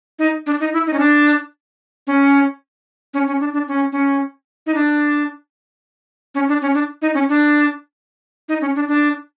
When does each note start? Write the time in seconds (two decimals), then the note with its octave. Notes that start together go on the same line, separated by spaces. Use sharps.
0.19 D#4
0.46 D4
0.60 D#4
0.73 E4
0.87 D#4
0.93 C#4
0.99 D4
2.07 C#4
3.14 C#4
3.27 C#4
3.40 D4
3.53 D4
3.68 C#4
3.92 C#4
4.66 D#4
4.75 D4
6.35 C#4
6.48 D4
6.62 C#4
6.74 D4
7.02 D#4
7.14 C#4
7.29 D4
8.49 D#4
8.61 C#4
8.75 D4
8.88 D4